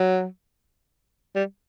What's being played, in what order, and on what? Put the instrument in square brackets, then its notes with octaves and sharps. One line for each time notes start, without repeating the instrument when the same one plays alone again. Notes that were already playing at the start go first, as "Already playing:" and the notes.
Already playing: [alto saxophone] F#3
G3